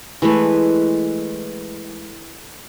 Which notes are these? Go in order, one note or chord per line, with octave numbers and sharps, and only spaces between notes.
E3 G#3 A3 B4